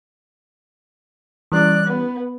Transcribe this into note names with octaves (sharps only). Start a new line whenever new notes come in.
E3 G3 C#4 D5 F#6
B3